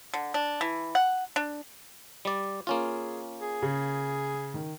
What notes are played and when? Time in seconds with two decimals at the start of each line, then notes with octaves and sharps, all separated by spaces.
0.14 D3
0.34 D4
0.61 E3
0.95 F#5
1.36 D4
2.25 G3 D5
2.67 A#3 C#4 F4 G#4
3.41 G#4
3.62 C#3
4.54 D#3